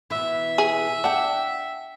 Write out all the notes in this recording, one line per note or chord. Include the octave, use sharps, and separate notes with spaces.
B2 E3 E5
G#4
D4 F#5 G5